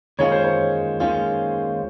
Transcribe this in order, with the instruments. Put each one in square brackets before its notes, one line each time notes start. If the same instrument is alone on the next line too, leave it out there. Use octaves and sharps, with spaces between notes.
[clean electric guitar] D#2 D#3 G#3 C#4 F4 [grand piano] C#5
[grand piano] C5
C#5
[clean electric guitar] D#2 D#3 G#3 C#4 F4